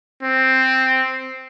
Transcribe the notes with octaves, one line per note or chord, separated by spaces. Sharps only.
C4